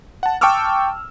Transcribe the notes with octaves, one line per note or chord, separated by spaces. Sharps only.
F#5 A5
G5 A5 C#6 D6 E6 F6